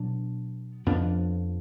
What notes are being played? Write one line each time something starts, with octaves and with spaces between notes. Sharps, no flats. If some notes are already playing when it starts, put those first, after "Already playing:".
Already playing: B2 F#3 B3 D4
F2 F3 B3 D4